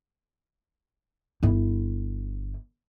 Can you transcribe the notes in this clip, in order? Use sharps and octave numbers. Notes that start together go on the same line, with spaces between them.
G1 E4